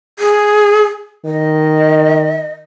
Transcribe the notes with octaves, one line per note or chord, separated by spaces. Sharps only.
G#4
D#3 D#5